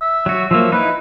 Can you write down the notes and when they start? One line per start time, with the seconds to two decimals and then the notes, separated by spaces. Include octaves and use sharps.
0.01 E5
0.26 F#3 F#4
0.51 F3 F#3 A#3 E5
0.72 D#4 E4 B4